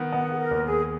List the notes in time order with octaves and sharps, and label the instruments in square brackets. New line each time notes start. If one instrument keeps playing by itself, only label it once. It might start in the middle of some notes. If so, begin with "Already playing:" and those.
Already playing: [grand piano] D#3 B3
[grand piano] B3 [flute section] F#5
[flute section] G#4
A#4
[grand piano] D#2
[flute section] G#4